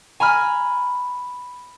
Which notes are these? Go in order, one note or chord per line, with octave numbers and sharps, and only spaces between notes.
G#5 A#5 B5 F6